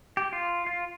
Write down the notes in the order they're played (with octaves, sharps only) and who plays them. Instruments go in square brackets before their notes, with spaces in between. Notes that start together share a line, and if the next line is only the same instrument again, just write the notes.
[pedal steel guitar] G4
F4
F4